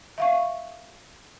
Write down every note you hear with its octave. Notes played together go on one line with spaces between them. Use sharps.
E5 F5 C#6